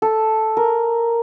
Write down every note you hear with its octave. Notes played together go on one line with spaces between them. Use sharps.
A4
A#4